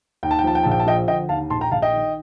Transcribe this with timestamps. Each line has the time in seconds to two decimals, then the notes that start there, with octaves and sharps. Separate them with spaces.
0.23 D#2 G5
0.31 A5
0.39 G5
0.44 F3 A5
0.55 G5
0.63 A#1 A5
0.71 G5
0.80 A5
0.86 F3 D#5 G5
1.08 D3 D#5 G5
1.29 D#2 F5 A5
1.50 A#1 A5 C6
1.61 G5 A#5
1.71 A#1 F5 A5
1.82 D#5 G5
1.93 D#3